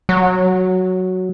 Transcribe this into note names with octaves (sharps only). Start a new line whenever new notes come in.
F#3